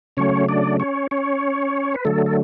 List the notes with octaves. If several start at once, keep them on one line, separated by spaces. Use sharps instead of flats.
C#3 F#3 A3 C#4 C#5
D4 D5
C#4 C#5
C#4 C#5
B4
D3 F#3 A3 A4
A4